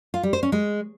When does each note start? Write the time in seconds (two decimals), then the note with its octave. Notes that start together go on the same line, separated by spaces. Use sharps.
0.14 F4
0.23 G3
0.33 C5
0.43 C#4
0.52 G#3